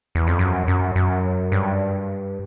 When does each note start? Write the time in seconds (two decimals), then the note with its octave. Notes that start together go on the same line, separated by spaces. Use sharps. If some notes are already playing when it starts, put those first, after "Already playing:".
0.15 E2
0.27 F2
0.39 F#2
0.68 F#2
0.96 F#2
1.52 G2